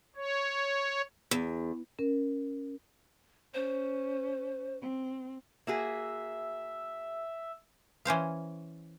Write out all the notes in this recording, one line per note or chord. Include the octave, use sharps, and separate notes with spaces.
C#5
E2
C#4 A#4
C#4 C5
C4
A#3 F#4 G#4 E5
E3 C#4 C5 F5